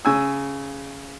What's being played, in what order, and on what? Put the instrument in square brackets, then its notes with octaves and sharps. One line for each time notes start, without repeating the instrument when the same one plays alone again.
[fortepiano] C#3 G#5 E6